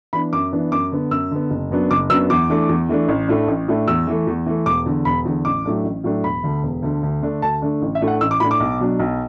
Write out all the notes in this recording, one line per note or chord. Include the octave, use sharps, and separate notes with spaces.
E3 B3 D4 B5
F#2 D6
E3 B3 D4
F#2 D6
D3 B3
F#2 E6
D3 B3
F#1
F#2 F#3 B3 D4
F#1 D6
F#2 F#3 B3 D4 E6
E2 D6
E3 A3 D4
E2
E3 A3 D4
A1
A2 A3 D4
A1
A2 A3 D4
E2 E6
E3 A3
E2
E3 A3
E1 D6
E2 D3
E1 B5
E2 D3
A1 D6
A2 F#3 A3 D4
A1
A2 F#3 A3 D4
E1 B5
D2 D3
E1
D2 D3
D2
D3 A3 D4
D2 A5
D3 A3 D4
A1
E5
A2 A3 D4
F#5
A1 E6
D6
A2 A3 D4 B5
D6
B1
B2 F#3 D4
B1